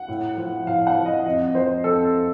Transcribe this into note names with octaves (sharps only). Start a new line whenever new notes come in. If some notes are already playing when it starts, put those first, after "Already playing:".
Already playing: F#5
A2
F3
A2 F5
F#5
F3
D#5
F2 D#5
F3 C5
F2 A4